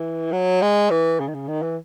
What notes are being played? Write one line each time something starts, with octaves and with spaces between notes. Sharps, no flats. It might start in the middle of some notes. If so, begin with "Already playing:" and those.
Already playing: E3
F#3
G#3
E3
C#3
D#3
C#3
D#3
E3